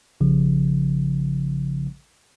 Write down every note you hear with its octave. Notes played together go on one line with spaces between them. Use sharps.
A1 C#3 F3